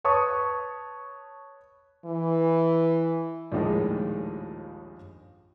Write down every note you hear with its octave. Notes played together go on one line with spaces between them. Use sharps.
B4 C#5 A5 C#6 D#6
E3
A#1 D#2 A2 D#3 G#3